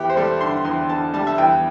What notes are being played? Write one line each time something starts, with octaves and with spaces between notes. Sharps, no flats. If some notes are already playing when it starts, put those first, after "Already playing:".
Already playing: E2 G4
C5
G3 A4
D3 C6
E2 C6
D3 A5
G3 A5
E5
E2 G5